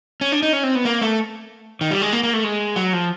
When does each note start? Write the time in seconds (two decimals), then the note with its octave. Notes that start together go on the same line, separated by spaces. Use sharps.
0.21 C#4
0.32 D4
0.42 D#4
0.53 C#4
0.63 C4
0.75 B3
0.85 A#3
1.01 A3
1.81 D#3
1.91 G3
2.02 G#3
2.13 A#3
2.23 A#3
2.33 A3
2.44 G#3
2.76 F#3
2.93 F3